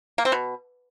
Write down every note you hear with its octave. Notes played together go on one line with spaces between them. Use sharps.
A#3
C4
B2